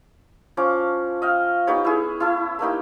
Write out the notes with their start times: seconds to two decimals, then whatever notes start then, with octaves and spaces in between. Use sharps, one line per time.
0.57 F3 C#4 D6
1.22 D#5 F5 G5
1.67 B3 D#4 G4 C#5
1.85 E4 G#4
2.20 E4 A4
2.59 A3 A#3 D#4 G4